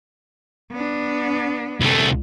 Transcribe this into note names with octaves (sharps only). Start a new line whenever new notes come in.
B3 D4
C2 A3